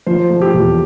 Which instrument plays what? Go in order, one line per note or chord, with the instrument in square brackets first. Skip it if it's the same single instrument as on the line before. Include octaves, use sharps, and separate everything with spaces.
[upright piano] F3 [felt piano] C5
[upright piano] A3
[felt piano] G4
[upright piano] E2